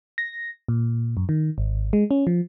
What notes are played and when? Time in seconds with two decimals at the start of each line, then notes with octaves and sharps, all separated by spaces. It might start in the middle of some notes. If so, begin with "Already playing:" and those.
0.18 A#6
0.68 A#2
1.17 F#2
1.29 D#3
1.58 G#1
1.93 G#3
2.11 C#4
2.27 F3